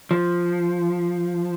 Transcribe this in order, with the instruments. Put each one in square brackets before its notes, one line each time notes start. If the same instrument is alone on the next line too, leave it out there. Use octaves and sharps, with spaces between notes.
[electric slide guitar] F3